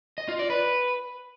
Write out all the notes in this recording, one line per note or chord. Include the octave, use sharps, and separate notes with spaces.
D#5
F4
D5
B4